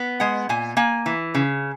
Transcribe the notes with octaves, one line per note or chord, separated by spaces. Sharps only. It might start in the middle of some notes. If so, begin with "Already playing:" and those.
Already playing: B3
G#3 F#5
A#2 G#5
A#3 G#5
E3
C#3